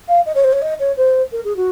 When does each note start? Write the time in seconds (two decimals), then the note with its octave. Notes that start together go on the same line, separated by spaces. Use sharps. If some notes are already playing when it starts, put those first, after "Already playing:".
0.08 F5
0.26 D#5
0.35 C#5
0.44 C5
0.52 C#5
0.62 D#5
0.79 C#5
0.97 C5
1.32 A#4
1.44 G#4
1.57 F#4